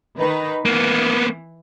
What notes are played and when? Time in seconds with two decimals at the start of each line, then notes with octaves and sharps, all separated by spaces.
0.19 D#3 D#4 B4
0.66 E3 A#3 B3